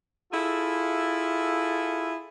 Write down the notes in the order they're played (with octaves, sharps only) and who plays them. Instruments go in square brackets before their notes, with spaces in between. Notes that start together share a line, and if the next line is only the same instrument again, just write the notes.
[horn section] E4 F4 G#4 A4